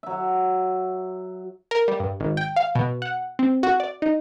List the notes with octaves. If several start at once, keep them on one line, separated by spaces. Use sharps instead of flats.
F#3 E5
A#4
G3
G2
G#1
G5
F5
B2
F#5
C4
F#4
D5
D#4